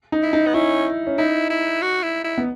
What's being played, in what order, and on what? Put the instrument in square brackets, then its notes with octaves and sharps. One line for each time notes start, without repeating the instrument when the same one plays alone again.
[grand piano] D#4
[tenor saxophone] E4
[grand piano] D#4
[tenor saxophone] B3
[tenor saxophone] C#4 [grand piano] E4
[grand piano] C#4
[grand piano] D#4 [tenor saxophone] E4
[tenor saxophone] E4
F#4
E4
E4
[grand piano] B3